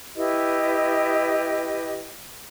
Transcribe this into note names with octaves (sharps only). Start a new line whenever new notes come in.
E4 G4 B4 D#5